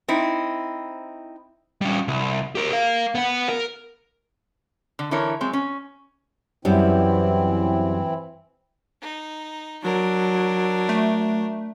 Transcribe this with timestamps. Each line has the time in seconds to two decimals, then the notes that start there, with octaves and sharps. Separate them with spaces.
0.08 C4 D#4 E4
1.81 G3 C#4
2.08 C2
2.55 G4 A#4
2.72 A#4 F5
3.15 B3 F#5
3.49 A#4
4.99 D3
5.11 D3 E3 E4 A#4 C#5
5.41 F#3 G#3 C4
5.53 C#4
6.65 F#2 E3 G3 C4 E4
9.02 D#4
9.84 F#3 D4 A#4
10.89 A3